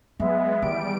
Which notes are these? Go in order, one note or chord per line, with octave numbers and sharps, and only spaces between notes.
F#3 G#3 B3 E5
E2 D#3 G3 D7